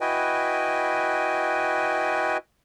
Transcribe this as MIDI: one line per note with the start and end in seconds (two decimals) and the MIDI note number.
0.01 2.37 64
0.01 2.37 66
0.01 2.37 71
0.01 2.37 75
0.01 2.37 79
0.01 2.37 80